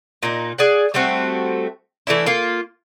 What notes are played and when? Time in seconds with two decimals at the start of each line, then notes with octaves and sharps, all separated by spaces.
0.23 A#2 D#4
0.58 G#4 D5 F#5
0.94 G3 A3 C4 F#4
2.07 E3 A3 D4 E4
2.26 A#3 F4